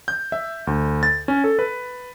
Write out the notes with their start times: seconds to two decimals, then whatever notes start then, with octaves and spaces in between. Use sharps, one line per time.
0.08 G6
0.32 E5
0.67 D2
1.03 A6
1.28 C#4
1.44 A4
1.59 B4